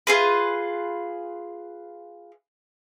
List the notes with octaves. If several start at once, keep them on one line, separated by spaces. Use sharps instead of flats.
F4 G#4 B4